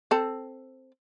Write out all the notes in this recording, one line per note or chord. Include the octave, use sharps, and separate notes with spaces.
C4 A4